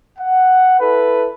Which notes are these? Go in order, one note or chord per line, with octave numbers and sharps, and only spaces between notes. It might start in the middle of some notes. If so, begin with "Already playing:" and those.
F#5
E4 A4 B4